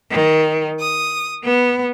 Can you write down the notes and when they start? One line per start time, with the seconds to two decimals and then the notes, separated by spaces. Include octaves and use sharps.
0.11 D#3
0.79 D#6
1.43 B3